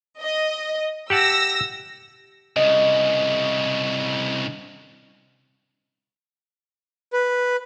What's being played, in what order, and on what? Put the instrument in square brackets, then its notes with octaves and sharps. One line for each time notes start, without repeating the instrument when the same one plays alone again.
[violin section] D#5
[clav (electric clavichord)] G4 F#5 A5 [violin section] E6 A#6
[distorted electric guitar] C2 C#3 [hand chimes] D#5
[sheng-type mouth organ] B4